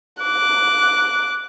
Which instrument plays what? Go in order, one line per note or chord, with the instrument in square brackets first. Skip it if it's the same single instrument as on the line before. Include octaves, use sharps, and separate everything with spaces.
[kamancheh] D6 F#6